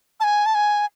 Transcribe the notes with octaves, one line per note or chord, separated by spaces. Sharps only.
A5
G#5
A5
G#5